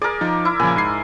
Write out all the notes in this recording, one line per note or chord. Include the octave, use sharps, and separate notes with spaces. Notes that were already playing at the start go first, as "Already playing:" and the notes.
G#4 A#4 D5
F3 D#4
E4
A#2 C#3 F3 G#5
G#2 C7